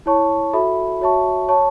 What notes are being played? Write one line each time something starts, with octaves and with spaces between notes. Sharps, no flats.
E4 C#5 A5 C#6
F#4 A4 E5 B5
F#4 C#5 E5 A5 C#6
C#5 A5 C#6